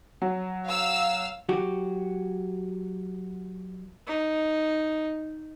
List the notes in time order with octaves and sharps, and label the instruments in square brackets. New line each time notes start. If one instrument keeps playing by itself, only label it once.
[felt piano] F#3
[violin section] F5 E6
[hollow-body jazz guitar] F#3 F#4 G4
[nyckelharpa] D#4